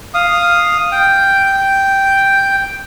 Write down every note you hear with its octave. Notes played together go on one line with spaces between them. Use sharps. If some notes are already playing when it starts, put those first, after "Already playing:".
F5 D#6
G5